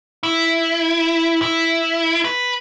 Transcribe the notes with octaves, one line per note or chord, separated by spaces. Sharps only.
E4
E4
B4